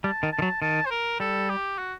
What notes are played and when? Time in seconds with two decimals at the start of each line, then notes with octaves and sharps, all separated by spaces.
0.04 G3 A5
0.23 D#3
0.32 A5
0.39 D#3
0.42 F#3
0.62 D#3 A5
0.86 C5
0.91 A#4
1.20 G3 A4
1.49 G4
1.78 F#4